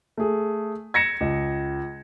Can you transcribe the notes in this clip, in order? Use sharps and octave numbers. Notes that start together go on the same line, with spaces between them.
A3 G#4
G#6 A#6 C#7 E7
C#2